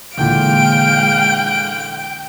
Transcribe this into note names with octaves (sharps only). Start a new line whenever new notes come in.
A#2 D3 E3 G#3 F5 G5 D7